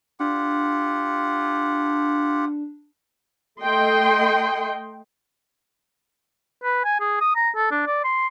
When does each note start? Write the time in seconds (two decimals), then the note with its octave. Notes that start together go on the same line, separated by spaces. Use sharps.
0.20 D4 F4 G4 F#5
3.62 A3 A4 D#5 G5 C6
6.64 B4
6.85 G#5
7.00 G#4
7.21 D#6
7.36 A#5
7.56 A4
7.71 D4
7.87 D5
8.04 C6